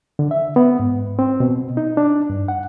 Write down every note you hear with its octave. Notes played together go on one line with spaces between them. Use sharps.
D3
E5
B3
G#2
C4
B2
D#4
D4
G2
F#5